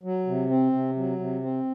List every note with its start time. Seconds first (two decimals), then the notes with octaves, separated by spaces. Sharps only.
0.03 F#3
0.27 C3
0.50 C4
0.73 C3
0.96 F#3
1.19 C3
1.42 C4